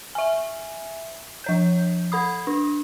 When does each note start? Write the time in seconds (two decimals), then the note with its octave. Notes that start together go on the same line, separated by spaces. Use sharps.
0.15 E5 G#5
1.44 F3 C#5 G6
2.12 A4 B5 D#6
2.47 D4